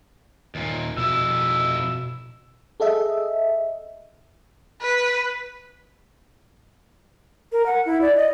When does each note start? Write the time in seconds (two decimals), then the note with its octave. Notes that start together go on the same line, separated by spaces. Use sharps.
0.55 D#2 A#2
0.97 F2 B2 E4 E6
2.80 G#4 A4 D#5 E5
4.81 B4
7.52 A#4
7.66 F#5
7.86 E4
8.01 D5
8.16 D#5